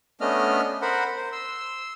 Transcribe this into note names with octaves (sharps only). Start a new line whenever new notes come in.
A3 B3 C#4 D4 D#5 F6
A#4 C5 F#5 B5
C5
C6 E6